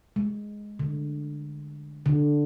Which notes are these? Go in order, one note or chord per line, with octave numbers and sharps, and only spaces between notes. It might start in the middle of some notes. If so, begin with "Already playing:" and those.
G#3
D3
D3